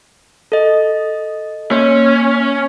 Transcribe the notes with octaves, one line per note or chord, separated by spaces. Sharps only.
A4 D#5
A#3 C#4